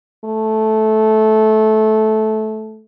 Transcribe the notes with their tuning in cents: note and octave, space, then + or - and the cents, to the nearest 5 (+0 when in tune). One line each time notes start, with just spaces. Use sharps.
A3 -15